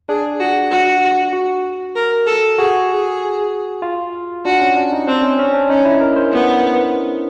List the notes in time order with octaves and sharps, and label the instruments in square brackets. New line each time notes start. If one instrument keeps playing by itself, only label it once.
[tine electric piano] D4 [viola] G#4
[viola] F#4
F#4
[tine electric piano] F#4
[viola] A#4
A4
[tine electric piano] F#4 [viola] G#4
[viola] G#4
[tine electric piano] F4
[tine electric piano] D4 [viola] F#4
[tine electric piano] C#4
D4
D#4
[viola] C4 [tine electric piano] D4
[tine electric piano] C#4
C#4
D4
[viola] C#4 [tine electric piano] D#4
[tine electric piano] E4
A#4
C5
[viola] B3